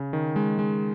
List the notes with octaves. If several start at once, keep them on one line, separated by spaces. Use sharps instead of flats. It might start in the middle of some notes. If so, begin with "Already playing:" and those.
Already playing: C#3
D#3
G#3
G#3